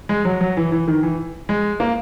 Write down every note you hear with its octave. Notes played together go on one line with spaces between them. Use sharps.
G#3
F#3
F#3
E3
E3
D#3
E3
G#3
A#3